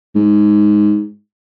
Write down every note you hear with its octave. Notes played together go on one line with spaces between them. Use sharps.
G#2